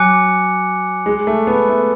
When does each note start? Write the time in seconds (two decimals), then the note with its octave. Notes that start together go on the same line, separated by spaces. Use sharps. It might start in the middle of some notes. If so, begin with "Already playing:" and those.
Already playing: F#3 G#5 D6 F#6 C#7
1.06 G#3
1.27 A3
1.47 B3
1.69 A3